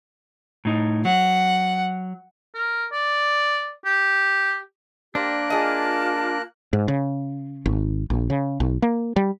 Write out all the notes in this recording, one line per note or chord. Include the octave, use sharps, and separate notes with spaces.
A2 D#4
F#3 F#5
A#4
D5
G4
A#3 D4 G4 A#4 C5 D5 F#6
F4 G#4 D#5 A5
G#2
C#3
G#1
A#1
C#3
B1
A#3
G3